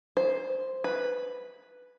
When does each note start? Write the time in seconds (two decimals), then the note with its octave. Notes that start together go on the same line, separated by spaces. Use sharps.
0.17 C5
0.84 B4